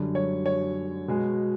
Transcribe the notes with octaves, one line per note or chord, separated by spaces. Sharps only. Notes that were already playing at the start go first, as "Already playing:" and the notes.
Already playing: F#2 D3 G3
C#5
C#5
B2 G#3